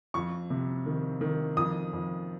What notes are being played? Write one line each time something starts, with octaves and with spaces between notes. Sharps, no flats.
F2 C#6
C3
D#3
D#3
F2 D#6
F2